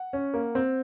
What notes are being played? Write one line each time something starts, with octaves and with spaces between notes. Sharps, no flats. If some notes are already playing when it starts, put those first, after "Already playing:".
Already playing: F#5
C#4
A#3
C4